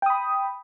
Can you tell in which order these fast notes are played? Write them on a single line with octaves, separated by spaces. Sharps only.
G5 D#6 B5